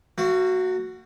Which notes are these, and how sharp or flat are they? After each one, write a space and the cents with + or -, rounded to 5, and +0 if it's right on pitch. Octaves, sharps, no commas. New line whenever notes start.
A#3 -40 F#4 +0